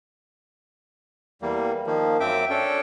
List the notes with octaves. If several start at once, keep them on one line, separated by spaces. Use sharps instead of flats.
E2 G3 A#3
D#3 F3 A#3
F#2 C4 E5 G5 D6
C#4 D4 A4 G5